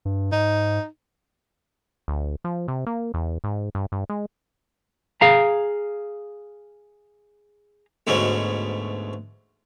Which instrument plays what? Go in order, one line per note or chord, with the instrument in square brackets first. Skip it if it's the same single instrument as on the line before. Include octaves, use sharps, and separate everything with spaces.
[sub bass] G2
[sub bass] G#2 [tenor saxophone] D#4
[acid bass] D2
F3
C3
A#3
E2
G#2
G2
G2
G#3
[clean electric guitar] G#4 F5 A#5
[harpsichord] D2 G#2 B2 C#4